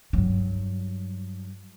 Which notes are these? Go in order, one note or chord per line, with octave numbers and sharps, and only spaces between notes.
G2 F#3